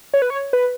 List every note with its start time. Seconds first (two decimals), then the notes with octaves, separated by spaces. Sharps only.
0.14 C#5
0.22 B4
0.30 C#5
0.53 B4